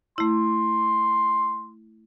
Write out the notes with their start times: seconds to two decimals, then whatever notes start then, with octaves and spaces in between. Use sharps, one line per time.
0.18 A3 E4 C6